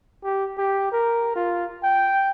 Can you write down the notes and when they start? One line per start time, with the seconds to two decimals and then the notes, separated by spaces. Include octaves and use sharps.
0.23 G4
0.58 G4
0.92 A#4
1.36 F4
1.83 G5